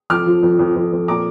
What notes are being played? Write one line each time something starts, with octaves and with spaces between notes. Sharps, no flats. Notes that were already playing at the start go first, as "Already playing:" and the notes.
F2 D6 F6
F3
F2
F2
F2
F2
A#2 A#5 D6